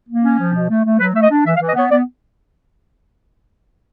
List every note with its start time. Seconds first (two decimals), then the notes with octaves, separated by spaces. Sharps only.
0.08 A#3
0.23 C#4
0.38 F3
0.54 B2
0.69 A3
0.84 A3
0.99 F#3 B4
1.14 A3 E5
1.22 D#5
1.30 D4
1.45 E3 E5
1.56 F5
1.60 E3
1.67 D#5
1.75 B3 C#5
1.90 B3 D5